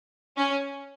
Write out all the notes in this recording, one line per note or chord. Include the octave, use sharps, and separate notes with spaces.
C#4